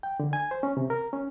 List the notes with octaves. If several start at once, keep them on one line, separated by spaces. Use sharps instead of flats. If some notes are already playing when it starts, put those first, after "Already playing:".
G5
D3
G#5
C5
C#4
C3
A#4
C#4